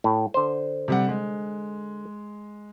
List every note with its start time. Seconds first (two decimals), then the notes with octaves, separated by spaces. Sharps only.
0.04 A2
0.34 D3 C5
0.88 C3 G3 F#5
1.09 G#3